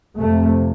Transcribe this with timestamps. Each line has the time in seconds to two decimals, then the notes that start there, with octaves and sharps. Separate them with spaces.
0.18 F2 C3 A3